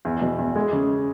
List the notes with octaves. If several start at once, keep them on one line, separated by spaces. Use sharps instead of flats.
E2
B2
E2
G#3
C#3